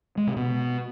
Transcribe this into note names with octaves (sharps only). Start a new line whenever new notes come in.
G#3
C3
B2